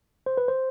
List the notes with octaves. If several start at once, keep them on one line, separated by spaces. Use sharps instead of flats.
C5
B4
C5